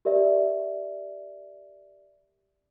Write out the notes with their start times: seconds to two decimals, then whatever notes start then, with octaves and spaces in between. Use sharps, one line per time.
0.05 G4 A#4 D5 E5